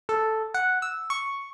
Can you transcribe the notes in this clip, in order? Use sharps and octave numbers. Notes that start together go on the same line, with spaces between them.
A4
F#5
E6
C#6